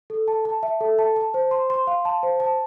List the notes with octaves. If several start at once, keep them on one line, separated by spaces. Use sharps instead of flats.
A4
A5
A5
E5
A4
A5
A5
C5
C6
C6
F5
A5
C5
A5